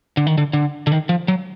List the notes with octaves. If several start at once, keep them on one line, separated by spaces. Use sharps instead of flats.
D3
D#3
D3
D3
D3
D#3
F3
F#3